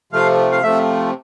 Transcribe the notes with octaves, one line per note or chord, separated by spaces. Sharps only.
C3 F3 A3 F5
F5
C3 F3 A3 E5